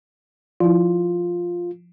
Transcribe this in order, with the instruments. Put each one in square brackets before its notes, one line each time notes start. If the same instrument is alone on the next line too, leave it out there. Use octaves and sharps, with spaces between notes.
[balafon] F3 E4 [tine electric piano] F4